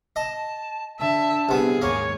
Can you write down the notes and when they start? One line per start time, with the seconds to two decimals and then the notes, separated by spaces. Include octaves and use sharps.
0.16 D#5 A5
1.00 D3 E5 A5
1.49 C2 B3 G#4
1.82 D#2 G#2 A#3 C#5